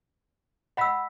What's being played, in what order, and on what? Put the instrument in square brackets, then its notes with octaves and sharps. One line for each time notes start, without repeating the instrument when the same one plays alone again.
[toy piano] D#5 E6 [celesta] F#5 B5 B6